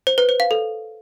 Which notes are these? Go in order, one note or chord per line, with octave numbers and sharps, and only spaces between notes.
C5
B4
C5
F5
A4